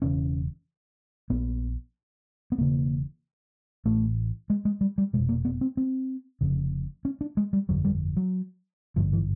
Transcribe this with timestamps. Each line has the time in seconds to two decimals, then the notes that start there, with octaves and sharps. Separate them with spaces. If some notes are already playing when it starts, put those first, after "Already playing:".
0.02 E1 E2 C#3 C#4
1.30 A#1 A#2 B3
2.52 B3
2.58 E1 E2 C#3 A#3
3.85 A1 A2 A3
4.50 G#3
4.65 G#3
4.81 G3
4.98 G3
5.13 F1 E2 B2 G#3
5.29 A#3
5.45 B3
5.61 C4
5.77 C4
6.41 F1 F2 C#3
7.05 C#4
7.21 D4
7.37 G#3
7.53 G3
7.69 G1 F2 D3 F#3
7.85 G3
8.17 F#3
8.96 G#1 G2 D3 F3
9.13 E3